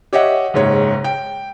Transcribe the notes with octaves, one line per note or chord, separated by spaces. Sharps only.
G4 C#5 D#5 E5 F#5
F#1 G#2 C#5
G5